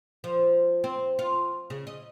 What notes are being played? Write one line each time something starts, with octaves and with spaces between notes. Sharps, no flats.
F3
C4
F4
C#3
D#5